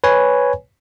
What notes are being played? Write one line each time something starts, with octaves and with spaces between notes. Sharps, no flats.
B4 C#5 G#5